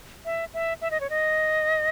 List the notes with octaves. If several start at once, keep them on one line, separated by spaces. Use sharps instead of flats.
E5
E5
E5
D#5
C#5
D#5